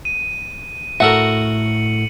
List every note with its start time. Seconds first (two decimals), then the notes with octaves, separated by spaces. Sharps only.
0.05 D#7
1.00 A2 F#4 A4 A#4 E5 C#7 F#7